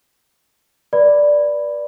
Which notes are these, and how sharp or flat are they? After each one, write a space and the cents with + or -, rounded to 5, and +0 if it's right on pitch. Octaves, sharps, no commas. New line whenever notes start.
B4 -35 D5 +0 B5 +0